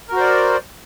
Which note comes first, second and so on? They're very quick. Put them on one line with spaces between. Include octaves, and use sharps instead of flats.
A#4 F#4 C5 D5